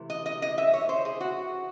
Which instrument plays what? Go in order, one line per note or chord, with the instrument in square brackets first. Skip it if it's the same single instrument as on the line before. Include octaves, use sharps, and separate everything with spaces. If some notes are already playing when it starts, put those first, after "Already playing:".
Already playing: [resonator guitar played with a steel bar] C3 E3 A3
D#5
D#5
D#5
E5
C#5
C5
G#4
F#4